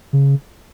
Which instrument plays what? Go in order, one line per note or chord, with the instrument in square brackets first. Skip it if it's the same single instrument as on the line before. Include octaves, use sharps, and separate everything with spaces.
[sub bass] C#3